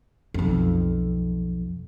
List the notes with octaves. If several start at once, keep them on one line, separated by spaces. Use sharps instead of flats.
B1 F2